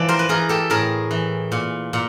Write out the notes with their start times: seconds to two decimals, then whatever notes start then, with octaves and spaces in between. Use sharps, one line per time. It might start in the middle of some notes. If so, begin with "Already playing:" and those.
Already playing: E3 F3 D5
0.09 A#4 C5
0.19 B4
0.29 E3 G#4 A#4
0.49 G4 A4
0.70 A2 G#4 A#4
1.11 E3
1.52 A#2
1.93 A#2